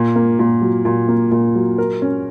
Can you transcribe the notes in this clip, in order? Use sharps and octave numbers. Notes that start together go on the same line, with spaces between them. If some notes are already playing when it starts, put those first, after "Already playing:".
Already playing: A#2
A#3
A#2
F#3
A#2
A#3
A#2
F#3
A#4
C#4